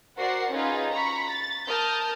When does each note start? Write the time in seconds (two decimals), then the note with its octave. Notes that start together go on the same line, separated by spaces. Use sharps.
0.17 F#4 A#4 C5 D5 F#5 C7
0.53 C#4 D#4 F4 G#4 B4 F5
0.91 A#5 B5 C#6
1.29 A6
1.67 A#4 A5 D#6 F6 G6